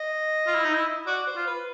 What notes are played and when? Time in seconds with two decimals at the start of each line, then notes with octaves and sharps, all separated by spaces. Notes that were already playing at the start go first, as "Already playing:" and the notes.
Already playing: D#5
0.47 F4
0.56 E4
0.65 D#4
0.75 E4
1.07 F#4 D5
1.27 C5
1.36 F4
1.47 B4